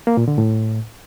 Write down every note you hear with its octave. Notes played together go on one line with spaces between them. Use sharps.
A#3
A#2
D3
A2